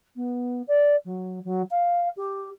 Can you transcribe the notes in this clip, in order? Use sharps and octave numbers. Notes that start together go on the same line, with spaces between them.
B3
D5
F#3
F#3
F5
G4